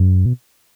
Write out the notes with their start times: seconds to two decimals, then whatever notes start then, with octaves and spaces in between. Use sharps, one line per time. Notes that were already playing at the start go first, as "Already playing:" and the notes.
Already playing: F#2
0.26 B2